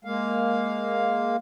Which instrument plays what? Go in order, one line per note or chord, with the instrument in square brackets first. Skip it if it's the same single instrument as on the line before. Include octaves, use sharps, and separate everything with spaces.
[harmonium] G#3 A#3 F5